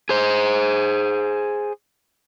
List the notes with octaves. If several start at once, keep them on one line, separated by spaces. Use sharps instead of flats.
G#4 C5